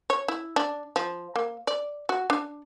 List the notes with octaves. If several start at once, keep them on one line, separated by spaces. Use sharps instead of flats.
C#5
E4
D4
F3
A#3
D5
F#4
D4